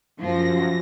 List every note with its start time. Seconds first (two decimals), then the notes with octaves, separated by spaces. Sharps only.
0.20 F#2 F3 A#6